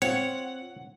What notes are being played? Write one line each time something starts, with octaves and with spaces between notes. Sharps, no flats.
C4 F4 C#5 F#5